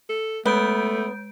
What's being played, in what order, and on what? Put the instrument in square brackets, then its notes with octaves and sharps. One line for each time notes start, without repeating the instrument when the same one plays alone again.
[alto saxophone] A4
[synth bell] G#3 G6 D7 [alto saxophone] A3 [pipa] B3